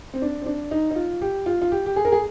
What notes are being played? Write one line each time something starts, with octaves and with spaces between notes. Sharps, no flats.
C4
D4
C4
D4
D#4
D#4
F4
G4
F4
F4
G4
G4
G#4
A#4
G#4